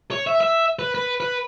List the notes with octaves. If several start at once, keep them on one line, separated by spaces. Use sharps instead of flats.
C#5
E5
E5
B4
B4
B4